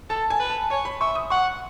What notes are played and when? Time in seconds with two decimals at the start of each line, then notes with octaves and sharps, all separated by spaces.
0.10 A4 A5
0.30 G#5
0.40 B4
0.50 A5
0.70 C#5 G#5
0.85 B5
1.01 E5 C#6
1.15 D#6
1.30 F#5 C#6